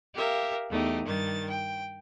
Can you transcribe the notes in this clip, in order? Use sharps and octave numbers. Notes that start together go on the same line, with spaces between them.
G4 A#4 E5 F5
E2 A3 D#4 G4
G2 D#3 A6
G5